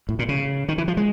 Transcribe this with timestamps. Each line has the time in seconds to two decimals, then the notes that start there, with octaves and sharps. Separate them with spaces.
0.09 A2
0.19 A#2
0.29 C#3
0.68 D#3
0.78 E3
0.88 F3
0.97 G#3